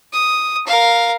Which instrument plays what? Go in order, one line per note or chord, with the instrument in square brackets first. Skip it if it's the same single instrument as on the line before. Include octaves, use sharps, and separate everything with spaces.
[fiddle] D#6
A#4 F5